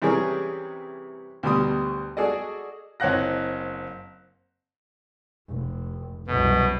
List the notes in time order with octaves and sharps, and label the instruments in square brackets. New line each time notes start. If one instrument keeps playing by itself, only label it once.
[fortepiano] C3 E3 G3 C#4 G#4 A#4
D2 B2 G3 B5 D#6
F#4 G#4 A4 D5 D#5
[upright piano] F#1 C4 C#5 F5 F#6 A#6
[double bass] F1
[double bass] C2 F#2 [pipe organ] B2